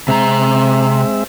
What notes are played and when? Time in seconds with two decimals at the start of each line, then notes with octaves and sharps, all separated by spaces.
0.08 C3 G#3 C4 E5 A#5